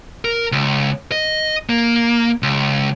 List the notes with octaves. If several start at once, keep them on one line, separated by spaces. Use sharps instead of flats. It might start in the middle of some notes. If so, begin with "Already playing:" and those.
A#4
C#2
D#5
A#3
C#2